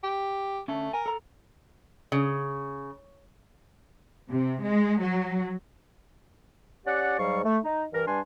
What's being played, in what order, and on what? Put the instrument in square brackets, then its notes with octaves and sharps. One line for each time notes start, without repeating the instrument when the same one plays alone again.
[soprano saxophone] G4
[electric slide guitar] D3 C#4 [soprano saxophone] A3
[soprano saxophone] A#4 [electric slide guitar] G#5
[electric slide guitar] A4 A#5
[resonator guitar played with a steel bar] C#3
[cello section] C3
G#3
F#3
[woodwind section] C#4 G4 D5 F#5
G#2 F#3 G3 F5 C#6
A3
D#4
G2 E3 A#4
G2 G3 D4 G#5 C6